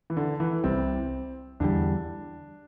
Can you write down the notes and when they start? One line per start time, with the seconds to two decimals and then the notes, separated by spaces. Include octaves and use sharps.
0.10 E3
0.17 D3
0.40 E3
0.64 C2 C3 G3 C4
1.60 E2 D3 G3 D4